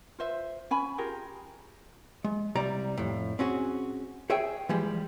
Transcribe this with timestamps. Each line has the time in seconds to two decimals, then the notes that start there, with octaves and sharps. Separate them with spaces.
0.19 F4 B4 C5 E5
0.71 C#4 G#5 B5
0.98 F4 G4 G#4 A#4
2.24 G#3
2.55 C2 G3 D5 A#5
2.98 F2 A2
3.39 C4 C#4 F#4 G#4
4.30 G#4 C#5 E5 G5 G#5
4.69 E3 F3 G3 G#3